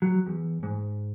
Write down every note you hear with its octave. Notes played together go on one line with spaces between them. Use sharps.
F#3
E2
G#2